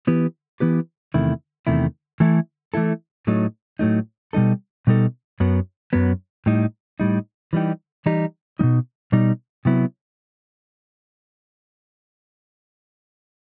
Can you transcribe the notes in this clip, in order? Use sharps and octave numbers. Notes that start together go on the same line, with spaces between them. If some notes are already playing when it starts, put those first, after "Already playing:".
E3 B3 E4 G4 B4
E3 B3 E4 G4 B4
E2 C3 D#3 A3 E4
E2 C3 D#3 A3 E4
E3 A3 E4 A4
E3 A3 E4 A4
A2 F#3 A3 D#4
A2 F#3 A3 D#4
B2 G3 D#4 A4
B2 G3 D#4 A4
F#2 F#3 B3
F#2 F#3 B3
A2 G3 D#4
A2 G3 D#4
E3 G3 D#4 G4
E3 G3 D#4 G4
B2 G3 D#4
B2 G3 D#4
C3 F#3 B3 E4